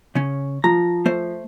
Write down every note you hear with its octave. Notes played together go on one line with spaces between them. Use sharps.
C#3 C#4
F3 A#5
A3 C5